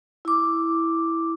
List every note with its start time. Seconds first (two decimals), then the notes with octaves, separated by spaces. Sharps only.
0.25 E4 D6